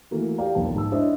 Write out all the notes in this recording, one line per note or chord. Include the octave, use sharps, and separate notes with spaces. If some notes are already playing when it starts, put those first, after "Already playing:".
E3 A3 A#3 F#4
G4 D5 F5 G5 A#5
B1 F2 A#3 A5
G#2 A5 E6
D4 E4 C5 C#5 D#5 E5